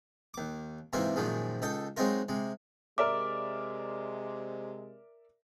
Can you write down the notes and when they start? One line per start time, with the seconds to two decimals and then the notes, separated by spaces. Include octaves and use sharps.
0.34 D#2 D6
0.93 G#2 C3 E3 A#3 F4 E5
1.16 F#2 A#2 D#3 F3 G#3
1.62 C#2 D#4 A4 G5
1.97 F#3 G#3 C4 D#4 F4 A#4
2.29 C3 G#3
2.98 C3 G#3 A#4 D5 E5 D6